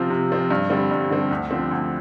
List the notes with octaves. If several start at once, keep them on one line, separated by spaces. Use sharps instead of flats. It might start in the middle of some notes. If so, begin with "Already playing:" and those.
Already playing: C3 F3 C4 F4
C3
F3 C4 F4
G2
D3 G3 C4
G2
D3 G3 C4
D2
D3 F3 C4
D2